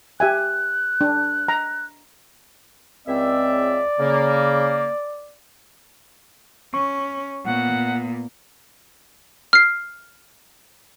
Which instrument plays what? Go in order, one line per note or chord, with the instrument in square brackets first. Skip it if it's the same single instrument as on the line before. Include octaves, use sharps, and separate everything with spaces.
[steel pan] G4 E5 G#5 [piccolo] F#6
[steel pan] D4
A#5
[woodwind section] C#2 C4 E5 [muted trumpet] D5
[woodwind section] C#3 A#3
[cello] C#4 [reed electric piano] C#6
[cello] A#2 B3 [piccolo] F#5
[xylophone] F6 C7